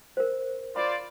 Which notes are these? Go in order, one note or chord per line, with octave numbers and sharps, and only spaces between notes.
A#4 C5
F4 C5 D5 B5